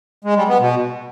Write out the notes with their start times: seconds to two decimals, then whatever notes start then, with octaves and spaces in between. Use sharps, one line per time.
0.24 G#3
0.36 G3
0.48 B3
0.60 B2